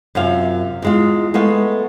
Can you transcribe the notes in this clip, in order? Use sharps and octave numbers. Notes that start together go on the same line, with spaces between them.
F#2 C3 F4 F5
E2 G#3 F4
G#3 A3 B3 F5